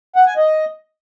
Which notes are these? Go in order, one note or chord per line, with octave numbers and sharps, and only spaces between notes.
F#5
G#5
D#5